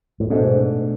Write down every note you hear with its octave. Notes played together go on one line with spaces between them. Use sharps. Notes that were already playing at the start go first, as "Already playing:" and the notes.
A2
G#2 B2 A3 D4